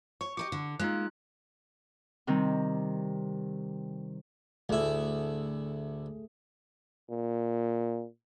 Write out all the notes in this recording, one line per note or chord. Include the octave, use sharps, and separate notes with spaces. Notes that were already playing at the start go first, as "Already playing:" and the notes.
C#5 C#6
G4 A4 D#5 D6 C#7
D3
G#3 A#3 D#4 F4 F#6
C3 D#3 G3 C4
D2 A3 E4 G#4
A#2